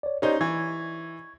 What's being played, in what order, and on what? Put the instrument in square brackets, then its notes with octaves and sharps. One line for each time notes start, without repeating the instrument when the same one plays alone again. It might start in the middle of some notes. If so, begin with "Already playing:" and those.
[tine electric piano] C#5 D5
[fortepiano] C#4 D#4 C5 [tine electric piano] G4 D5 D#5
[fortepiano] E3 [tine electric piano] C#6 G#6